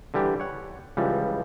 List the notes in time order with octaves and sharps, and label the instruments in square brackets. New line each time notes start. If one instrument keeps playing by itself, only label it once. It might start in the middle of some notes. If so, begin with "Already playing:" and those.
[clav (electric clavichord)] D3 E3 G3 G4
C#5 F#5
C#2 E3 F3 G3